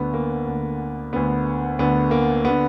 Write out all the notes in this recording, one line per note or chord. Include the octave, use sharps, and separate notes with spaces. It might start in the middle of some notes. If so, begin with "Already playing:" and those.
Already playing: D2 D3 B3
A#3
D2 D3
D2 D3 B3
D2 D3 B3
A#3
D3 B3